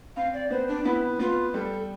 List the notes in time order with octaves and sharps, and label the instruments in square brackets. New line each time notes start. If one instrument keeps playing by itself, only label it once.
[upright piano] C4 [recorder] F5
[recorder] D5
[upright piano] B3 [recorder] C5
[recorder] D4
[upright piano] B3 [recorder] E4
[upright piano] B3 [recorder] F4
[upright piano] G3 [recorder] A4